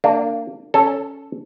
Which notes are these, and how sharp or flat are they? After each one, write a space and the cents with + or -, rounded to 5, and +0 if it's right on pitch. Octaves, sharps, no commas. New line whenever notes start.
A#3 -25 D4 +0
C#4 +0 A4 +0